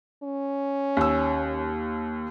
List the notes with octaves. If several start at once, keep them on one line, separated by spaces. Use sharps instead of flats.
C#4
D#2 E6